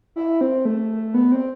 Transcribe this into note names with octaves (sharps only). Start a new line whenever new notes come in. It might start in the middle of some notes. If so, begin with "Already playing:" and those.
E4
C4
A3
B3
C4